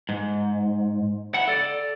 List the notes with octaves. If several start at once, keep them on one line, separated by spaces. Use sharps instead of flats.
G#2
E4 F#5
A4 D5